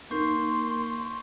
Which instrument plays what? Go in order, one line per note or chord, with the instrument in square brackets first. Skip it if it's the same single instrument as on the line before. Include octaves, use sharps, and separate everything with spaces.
[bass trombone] A#3 [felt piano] D#4 A#4 [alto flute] C6 [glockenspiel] C#6 G6 C7